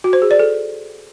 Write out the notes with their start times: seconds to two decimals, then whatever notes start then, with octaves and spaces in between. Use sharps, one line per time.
0.04 F#4
0.13 C5
0.22 G#4
0.31 D5
0.39 A4